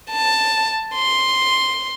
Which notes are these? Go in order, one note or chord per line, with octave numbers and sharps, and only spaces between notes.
A5
C6